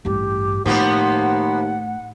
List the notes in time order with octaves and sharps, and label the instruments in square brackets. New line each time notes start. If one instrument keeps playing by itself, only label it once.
[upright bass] A1 G2 [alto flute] G4
[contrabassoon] D#2 [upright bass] A2 [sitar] F3 A#3 B3 [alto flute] F#5